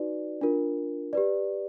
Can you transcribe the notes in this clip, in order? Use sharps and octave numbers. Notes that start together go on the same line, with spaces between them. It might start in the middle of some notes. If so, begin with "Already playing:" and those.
Already playing: D#4 F#4 B4 D5
D4 F4 A#4
G4 B4 D5